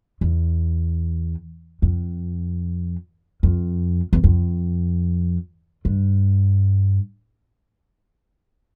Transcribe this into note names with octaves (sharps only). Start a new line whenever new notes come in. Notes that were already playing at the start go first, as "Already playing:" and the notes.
E2
F2
F2
E2
F2
G2